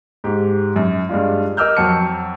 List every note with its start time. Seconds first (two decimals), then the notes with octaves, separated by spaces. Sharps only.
0.24 G#2 G4
0.76 F#2
1.09 G2 G#3 D4 F4
1.57 A#4 D#5 D6 E6 F6 G6
1.77 F2 F#3 F#4 A5 C#7